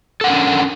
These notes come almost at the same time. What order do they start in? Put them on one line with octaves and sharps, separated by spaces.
A4 F#5 A#4 C#4 D4